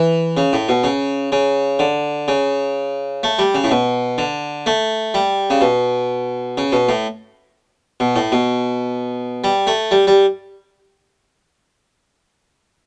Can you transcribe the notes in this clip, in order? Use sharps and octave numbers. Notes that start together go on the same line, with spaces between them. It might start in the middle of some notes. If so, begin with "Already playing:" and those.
Already playing: E3
C#3
A2
B2
C#3
C#3
D3
C#3
A3
G3
C#3
A2
B2
D3
A3
G3
C#3
B2
C#3
B2
A2
B2
A2
B2
G3
A3
G3
G3